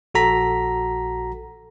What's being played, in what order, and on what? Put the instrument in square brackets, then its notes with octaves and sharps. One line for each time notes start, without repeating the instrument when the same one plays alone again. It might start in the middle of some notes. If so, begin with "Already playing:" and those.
[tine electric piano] A#1 F#4 A4 A#5 B6